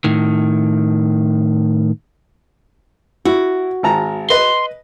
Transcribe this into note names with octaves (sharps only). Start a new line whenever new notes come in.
A2 D#3
E4 F#4
G#1 A5 A#5
B4 D#5 C6